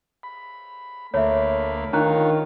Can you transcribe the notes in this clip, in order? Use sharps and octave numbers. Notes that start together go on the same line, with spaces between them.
B5
D2 A3 A#3 C#5 E5 B5
D#3 D4 F4 C#5 A#5 F#6